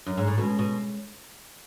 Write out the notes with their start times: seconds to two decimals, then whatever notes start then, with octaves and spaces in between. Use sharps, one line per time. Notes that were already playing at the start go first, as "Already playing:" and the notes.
0.06 F#2
0.17 G#2
0.27 A2
0.37 B2 G#3 C#4 G#4
0.59 B2